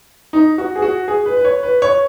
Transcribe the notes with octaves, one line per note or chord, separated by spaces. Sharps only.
D#4
F#4
G#4
F#4
G#4
B4
B4
C#5
B4
C#5